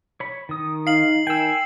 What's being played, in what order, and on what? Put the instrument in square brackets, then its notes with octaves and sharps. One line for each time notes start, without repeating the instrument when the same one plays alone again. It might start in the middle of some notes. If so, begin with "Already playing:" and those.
[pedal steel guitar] C#5 B5
D#3 D#6
[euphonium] D#4 [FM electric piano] F5 [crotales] C7 F#7
[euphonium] D#3 [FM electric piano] G5 E6 [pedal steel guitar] G#5